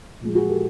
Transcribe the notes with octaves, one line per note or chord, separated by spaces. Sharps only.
A#2 F3 G#3
F#4 G#4
G4 A4